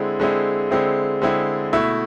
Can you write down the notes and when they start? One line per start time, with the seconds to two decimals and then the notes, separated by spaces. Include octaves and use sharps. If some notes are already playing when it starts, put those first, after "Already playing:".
Already playing: D3 G#3 C4 E4
0.20 D3 G#3 C4 E4
0.71 D3 G#3 C4 E4
1.22 D3 G#3 C4 E4
1.73 B2 A3 E4